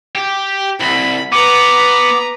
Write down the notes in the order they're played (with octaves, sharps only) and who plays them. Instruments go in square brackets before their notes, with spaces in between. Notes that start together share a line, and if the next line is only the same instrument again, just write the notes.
[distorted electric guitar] G4
[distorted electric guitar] C2 [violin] B5
[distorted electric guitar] B3 [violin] B4 A#5 [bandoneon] D6